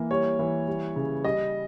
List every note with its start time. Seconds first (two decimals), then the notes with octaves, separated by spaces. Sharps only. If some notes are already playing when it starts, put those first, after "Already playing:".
Already playing: E3 A#3
0.11 G3 C#5
0.39 E3
0.67 G3
0.96 C#3
1.24 G3 D#5